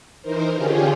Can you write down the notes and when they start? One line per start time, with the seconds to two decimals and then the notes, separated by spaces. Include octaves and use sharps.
0.22 E3 D#4 A#4 C5
0.55 D3 C#4 F4 G4 G#4